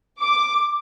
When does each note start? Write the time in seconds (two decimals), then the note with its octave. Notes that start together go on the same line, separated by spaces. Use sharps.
0.20 D6